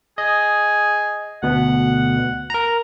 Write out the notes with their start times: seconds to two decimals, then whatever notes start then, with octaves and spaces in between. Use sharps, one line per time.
0.18 G#4 D#5
1.43 D2 B2 B3 F#5
2.50 A#4 A#5